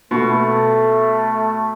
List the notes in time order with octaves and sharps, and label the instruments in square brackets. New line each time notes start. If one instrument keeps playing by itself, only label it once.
[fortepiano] B2 [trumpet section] A3